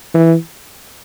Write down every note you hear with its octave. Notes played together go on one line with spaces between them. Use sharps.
E3